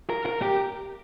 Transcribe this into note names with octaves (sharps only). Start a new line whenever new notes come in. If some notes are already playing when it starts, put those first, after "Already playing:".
A#4
A#4
G4